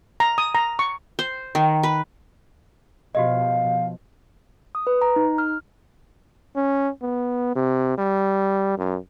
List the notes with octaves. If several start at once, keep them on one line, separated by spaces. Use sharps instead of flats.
A#5
D#6
A#5
C#6
C5
D#3
B4
B2 F3 F#4 G4 D#5 F5
D#6
B4
A#5
D#4
F6
C#4
B3
C3
G3
F#2